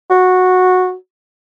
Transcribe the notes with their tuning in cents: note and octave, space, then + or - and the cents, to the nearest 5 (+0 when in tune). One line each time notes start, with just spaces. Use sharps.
F#4 -10